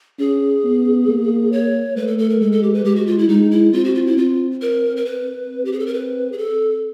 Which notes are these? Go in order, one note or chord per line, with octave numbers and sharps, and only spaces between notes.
C#4 G#4
B3
A#3
C#5
A3 B4
A4
A4
A#4
G#3 A4
A4
G4
B4
G#3 G4
F#4
F4
E4
G#3 D#4
E4
C4 F4
F#4
F4
E4
C4 F4
A#4
A#4
B4
C4
G4
G#4
A4
A#4
B4
G#4
A4